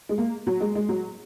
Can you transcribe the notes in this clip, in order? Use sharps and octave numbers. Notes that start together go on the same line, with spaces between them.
G#3
A#3
F#3
G#3
G#3
F#3